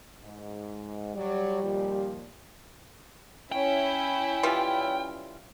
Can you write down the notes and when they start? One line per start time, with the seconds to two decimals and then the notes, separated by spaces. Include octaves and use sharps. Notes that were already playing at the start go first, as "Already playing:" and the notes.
0.23 G#2
1.15 F#3 G3 D5
1.63 D#2 A#2 F3
3.52 C#4 E4 G5
4.43 E3 G3 F4